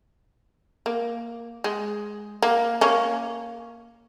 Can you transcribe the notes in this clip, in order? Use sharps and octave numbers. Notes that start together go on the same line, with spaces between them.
A#3
G#3
A#3
A#3 C#4